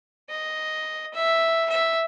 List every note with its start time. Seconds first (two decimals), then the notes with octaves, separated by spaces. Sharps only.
0.30 D#5
1.14 E5
1.70 E5